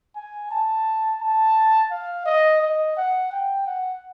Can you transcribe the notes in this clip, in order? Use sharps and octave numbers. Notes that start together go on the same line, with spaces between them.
G#5
A5
A5
F5
D#5
D#5
F#5
G5
F#5